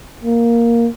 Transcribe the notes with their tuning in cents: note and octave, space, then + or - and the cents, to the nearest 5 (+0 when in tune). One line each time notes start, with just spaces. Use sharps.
A#3 +5